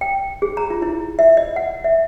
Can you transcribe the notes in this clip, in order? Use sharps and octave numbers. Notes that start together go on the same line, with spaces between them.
G5
G#4
A#5
F4
E4
E5
D#5
F#5
E5